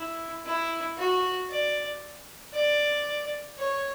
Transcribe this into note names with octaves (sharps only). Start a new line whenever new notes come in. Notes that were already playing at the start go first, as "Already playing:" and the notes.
Already playing: E4
E4
F#4
D5
D5
C#5